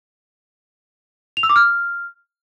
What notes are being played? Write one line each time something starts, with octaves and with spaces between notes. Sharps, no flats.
F7
E6
D6
F6